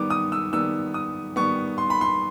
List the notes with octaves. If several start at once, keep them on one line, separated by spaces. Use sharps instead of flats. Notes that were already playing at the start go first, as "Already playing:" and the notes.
Already playing: D#3 G3 B3 D6
D#6
E6
D#3 G3 B3 E6
D#6
D#3 G3 B3 C#6
C6
B5
C6